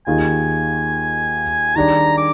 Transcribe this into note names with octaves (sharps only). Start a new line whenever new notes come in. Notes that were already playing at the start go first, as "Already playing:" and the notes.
D#2 D#3 A#3 F4 G#4 G#5
D#3 G3 D4 G#4 A#5
D6